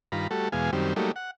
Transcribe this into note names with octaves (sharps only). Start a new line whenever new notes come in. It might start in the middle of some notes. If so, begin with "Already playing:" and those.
G2 D#3 F4 A#5 B5
G3 A3 F#4 A4
E2 B2 G#3 F5 G#5
F#2 D#3 G3 C4
F#3 G3 A3 A#3 D#4
F#5